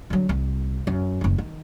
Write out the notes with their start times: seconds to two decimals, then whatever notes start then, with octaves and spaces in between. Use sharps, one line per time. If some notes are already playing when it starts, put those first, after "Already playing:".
0.10 D3 F#3
0.29 C2
0.87 F#2
1.21 F#1 D#3
1.38 D#3